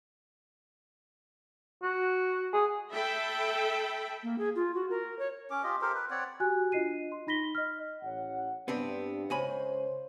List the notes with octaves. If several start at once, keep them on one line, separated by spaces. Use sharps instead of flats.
F#4
G#4
A4 E5 G5 B5
A#3
G#4
F4
F#4
A#4
C#5
C#4 D6
F4 G4 D#5
G4 A4 A#4 C5
B4
C4 C#5 D5 F#5
F#4 G4 G#5 F#6
D4 F4 D#5 C7 D#7
C6
D#4 B5 A#6 B6 G7
D#5 F6
A1 C#5 F#5
G2 B3 C4 D4
C#2 C5 C#5 G#5 B5